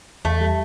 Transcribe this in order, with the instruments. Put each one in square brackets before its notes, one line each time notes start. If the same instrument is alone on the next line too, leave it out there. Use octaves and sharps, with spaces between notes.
[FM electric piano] E2 [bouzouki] A3
[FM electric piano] G3